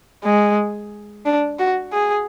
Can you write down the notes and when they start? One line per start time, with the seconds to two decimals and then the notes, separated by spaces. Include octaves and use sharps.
0.24 G#3
1.26 D4
1.59 F#4
1.93 G#4